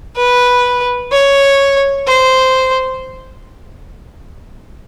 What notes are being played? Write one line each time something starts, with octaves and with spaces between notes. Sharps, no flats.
B4
C#5
C5